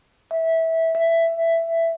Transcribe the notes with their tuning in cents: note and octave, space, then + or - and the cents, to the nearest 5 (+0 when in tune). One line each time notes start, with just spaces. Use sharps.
E5 -15
E5 +10